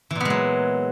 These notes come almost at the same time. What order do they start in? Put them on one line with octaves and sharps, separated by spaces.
E3 A#2 B3 G#3 F#3